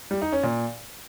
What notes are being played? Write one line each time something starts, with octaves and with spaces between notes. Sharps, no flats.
G3
D#4
C#4
A#2